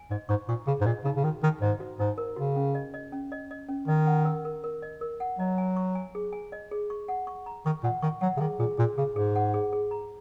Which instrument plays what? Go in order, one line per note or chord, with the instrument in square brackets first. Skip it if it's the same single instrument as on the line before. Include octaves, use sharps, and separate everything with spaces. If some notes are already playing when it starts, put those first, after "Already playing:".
Already playing: [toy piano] G#5
[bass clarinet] G#2 [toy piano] D#5
[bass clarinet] G#2 [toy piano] C#6
[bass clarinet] A#2 [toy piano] C#6
[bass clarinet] C#3 [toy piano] G#4
[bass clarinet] G#2
[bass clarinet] A#2 [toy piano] D#5
[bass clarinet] C#3 [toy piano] D#4
[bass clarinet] C#3
[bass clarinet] D#3 [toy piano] F#4
[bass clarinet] D#3 [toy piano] D#4
[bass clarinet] G#2 [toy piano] D#5
[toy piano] F#4
[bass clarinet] G#2 [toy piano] D#4
[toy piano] A#4
[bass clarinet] C#3 [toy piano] F#4
[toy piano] C#4
D#5
D#5
C#4
D#5
D#5
C#4
[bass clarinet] D#3 [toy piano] D#5
[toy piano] F#5
A#4
A#4
A#4
D#5
A#4
F#5
[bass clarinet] F#3 [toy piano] D#5
[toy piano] G#5
C#6
G#5
G#4
G#5
D#5
G#4
C#6
F#5
C#6
A#5
[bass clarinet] D#3 [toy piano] C#6
[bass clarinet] A#2 [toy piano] F#5
[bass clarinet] D#3 [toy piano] C#6
[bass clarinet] F#3 [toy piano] F#5
[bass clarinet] C#3
[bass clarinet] D#3 [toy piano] G#4
[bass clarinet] A#2 [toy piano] G#4
[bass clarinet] A#2 [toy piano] G#4
[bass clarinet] C#3 [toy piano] G#4
[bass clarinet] G#2 [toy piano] G#4
[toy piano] F#5
G#4
G#4
A#5